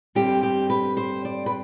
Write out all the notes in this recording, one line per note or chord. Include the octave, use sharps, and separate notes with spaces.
G2 D3 G3 C4 G4
G4
B4
C5
D5
B4